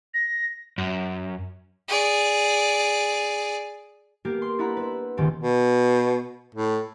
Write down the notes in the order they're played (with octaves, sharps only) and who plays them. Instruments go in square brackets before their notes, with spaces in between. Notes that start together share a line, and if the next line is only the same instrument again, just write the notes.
[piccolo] A#6
[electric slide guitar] F#2
[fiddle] G#4 D5
[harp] A#3 B3 G4 A#4
C6
D4 E4 B4 F#5 A#5 B5
B4 E5
D#1 C#2 D#3 C4 G4
[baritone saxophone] B2
A2